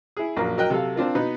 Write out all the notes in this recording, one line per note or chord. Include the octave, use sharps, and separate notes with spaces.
E4 G#4
A#1 F#2 F#3 A#3
F#3 A#4 D#5 G5 F#6
C3 F#3 A4 F5
C4 D4 F4 A#4
B2 B3 D#4